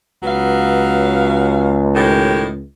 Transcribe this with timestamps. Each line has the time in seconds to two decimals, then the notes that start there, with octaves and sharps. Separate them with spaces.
0.23 C#2 F#3 B3 F5
1.95 A2 D#3 G4